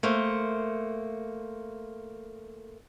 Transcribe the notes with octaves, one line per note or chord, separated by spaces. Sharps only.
A3 A#3 C5